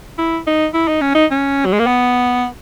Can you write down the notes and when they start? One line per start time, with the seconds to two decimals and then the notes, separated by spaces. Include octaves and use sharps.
0.18 E4
0.47 D#4
0.74 E4
0.88 D#4
1.01 C#4
1.15 D#4
1.31 C#4
1.65 F#3
1.73 G#3
1.79 A#3
1.87 B3